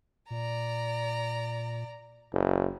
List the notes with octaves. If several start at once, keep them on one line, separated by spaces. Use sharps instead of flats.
A#2 D5 A#5
F#1